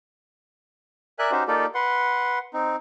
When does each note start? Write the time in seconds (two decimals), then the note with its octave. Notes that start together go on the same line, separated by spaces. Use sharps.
1.19 A#4 D5 E5 G#5 F#6
1.31 C#4 D#4 F#4 G4 C5
1.48 A#3 D#4 F4 G4 A4 D5
1.74 B4 F#5 C6
2.54 C4 D#4